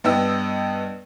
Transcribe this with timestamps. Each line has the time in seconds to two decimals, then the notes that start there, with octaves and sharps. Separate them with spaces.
0.04 G2 B3 D#5 G5 E6